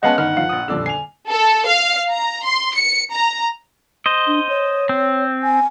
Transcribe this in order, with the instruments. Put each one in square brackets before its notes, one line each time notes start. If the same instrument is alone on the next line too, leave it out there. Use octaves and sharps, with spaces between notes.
[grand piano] G#3 B3 C#4 [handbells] D#5 F5 A5 [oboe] F#5
[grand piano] G1 D#3 [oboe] F#5 [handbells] F6
[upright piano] F3 [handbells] F5
[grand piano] A#1 D#6
[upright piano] D#1 F2 E6 [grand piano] D3 D5
[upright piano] G#5 F7 [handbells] C7
[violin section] A4
F5
A#5
C6
C#7
A#5
[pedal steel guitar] C5 D#5
[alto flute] D4
C#5
[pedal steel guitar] C4
[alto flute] G#5